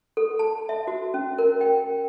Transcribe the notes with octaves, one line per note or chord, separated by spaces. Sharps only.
A4
A5
E5
F#4
C#4
A#4
G5